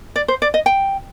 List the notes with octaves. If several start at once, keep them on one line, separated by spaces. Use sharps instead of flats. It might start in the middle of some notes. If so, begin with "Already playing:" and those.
D5
C5
D5
D#5
G5